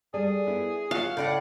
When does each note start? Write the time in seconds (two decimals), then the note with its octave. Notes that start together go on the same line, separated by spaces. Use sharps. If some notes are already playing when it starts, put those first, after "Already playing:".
0.14 G3 G#4 A4 D5
0.46 B3 E4
0.91 F#3 F4 F5
1.17 A2 C#3 A3 D5 F#5